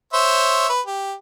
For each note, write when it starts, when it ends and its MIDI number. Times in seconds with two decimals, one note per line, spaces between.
0.13 0.69 72
0.13 0.69 73
0.13 0.69 76
0.69 0.81 71
0.86 1.14 67